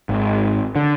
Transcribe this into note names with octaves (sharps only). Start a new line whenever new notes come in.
G#1
D3